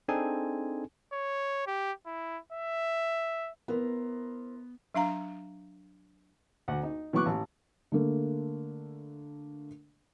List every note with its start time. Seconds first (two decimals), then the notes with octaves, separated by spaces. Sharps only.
0.08 C4 D4 D#4 G#4 A4 G#5
1.13 C#5
1.67 G4
2.06 E4
2.53 E5
3.68 B3 E4 A#4 C5
4.94 F#3 D4 F5 A#5
6.68 D2 F#5
6.83 D#4
7.13 E3 F#3 B3 C#6 D6 F#6
7.26 A1
7.92 D3 A3 A#3